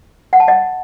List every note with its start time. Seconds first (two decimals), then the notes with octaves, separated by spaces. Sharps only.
0.33 F#5
0.40 A5
0.48 D#5 F#5